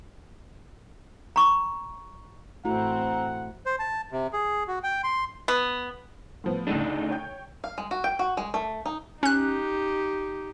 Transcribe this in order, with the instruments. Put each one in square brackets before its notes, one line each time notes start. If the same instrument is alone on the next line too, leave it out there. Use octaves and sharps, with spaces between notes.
[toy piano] A#5 C#6
[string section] A1 C4 [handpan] A3 E4 F#4 [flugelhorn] F#5 [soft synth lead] A#5
[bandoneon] C5
A5
C3
G#4
F#4
G5
C6
[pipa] B3
[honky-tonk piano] A2 F3 B3
[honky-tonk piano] D2 A2 C#3 [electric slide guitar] D4 D#4
[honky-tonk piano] C#5 G5 G6
[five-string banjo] F5
G#3
F#4
G5
F#4
G#3
A3
D#4
[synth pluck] C#4 F#6 [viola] D#4 G4